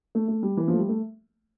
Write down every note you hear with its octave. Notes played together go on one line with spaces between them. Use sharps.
A3
A3
G3
E3
F3
A3
G3
A3